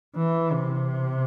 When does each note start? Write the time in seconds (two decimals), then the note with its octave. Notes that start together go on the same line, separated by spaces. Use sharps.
0.16 E3
0.53 C3